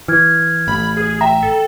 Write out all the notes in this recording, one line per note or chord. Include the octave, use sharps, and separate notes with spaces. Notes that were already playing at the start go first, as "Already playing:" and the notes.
E3 F6 G#6
A1 B5
G#4
E5 G5 A#5
A4